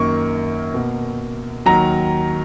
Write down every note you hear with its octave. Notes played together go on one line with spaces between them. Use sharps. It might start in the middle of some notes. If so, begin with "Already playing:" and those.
Already playing: F#2 D#3 A#3 C#6
B2 A#3
D#2 D#3 F#3 A#5